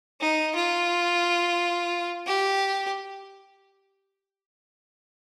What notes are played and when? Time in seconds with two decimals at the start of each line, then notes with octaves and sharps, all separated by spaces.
0.20 D#4
0.55 F4
2.26 G4